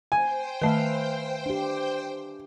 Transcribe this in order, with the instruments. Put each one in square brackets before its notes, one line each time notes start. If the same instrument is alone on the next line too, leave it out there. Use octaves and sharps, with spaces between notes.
[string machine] C5 G5 [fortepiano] G#5
[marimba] D#3 A3 [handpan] B4 E5 F5
[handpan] D4 G4